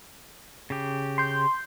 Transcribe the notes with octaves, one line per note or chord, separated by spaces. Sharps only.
C#3 G4
C6 G6